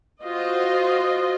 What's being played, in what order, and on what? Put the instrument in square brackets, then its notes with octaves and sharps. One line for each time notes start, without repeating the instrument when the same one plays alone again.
[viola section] F4 F#4 C5 D#5